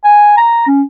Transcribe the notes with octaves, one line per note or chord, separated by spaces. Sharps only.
G#5
A#5
C#4